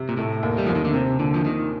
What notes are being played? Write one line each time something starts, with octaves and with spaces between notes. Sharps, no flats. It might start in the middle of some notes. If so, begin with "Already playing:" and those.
Already playing: C3
A#2
A2 A3
D#2
G3
D#2 F3
D#3
D3
C3 C4
A#2 D3
F3
A#2 D#3